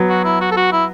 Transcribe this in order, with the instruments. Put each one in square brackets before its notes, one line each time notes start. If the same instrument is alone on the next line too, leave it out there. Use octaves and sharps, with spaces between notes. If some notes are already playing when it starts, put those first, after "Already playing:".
Already playing: [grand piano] F#3 B3
[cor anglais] F#4
E4
F#4
A4
F#4
E4